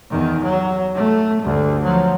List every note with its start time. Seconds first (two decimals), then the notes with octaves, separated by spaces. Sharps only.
0.10 E2 D#3
0.44 F#3
0.95 A3
1.42 D2 G2
1.84 F3 F#3